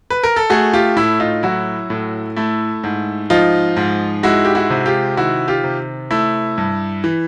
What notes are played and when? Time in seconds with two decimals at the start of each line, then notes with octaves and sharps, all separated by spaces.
0.10 B4
0.23 A#4
0.36 A4
0.50 A3 F#4 G#4
0.73 F4 G4
0.96 A2 E4
1.20 D#4 F4
1.43 F#3 E4 F#4
1.90 A2
2.36 A3 E4
2.84 G#2
3.30 F3 D#4 F4
3.76 G#2
4.23 G#3 E4 F#4
4.45 G4
4.55 E4 F#4
4.70 C3
4.86 F4 G4
5.17 D#3 E4 F#4
5.48 F4 G4
5.64 C3
6.11 A3 E4
6.58 G2
7.04 E3